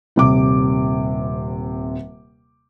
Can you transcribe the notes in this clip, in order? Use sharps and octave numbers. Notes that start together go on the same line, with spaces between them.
D#1 C3 D6